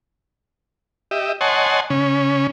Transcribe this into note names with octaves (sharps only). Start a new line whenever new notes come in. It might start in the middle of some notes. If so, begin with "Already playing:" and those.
G4 D#5 E5
C#5 D#5 F#5 G#5 A5 C6
C#3 C#4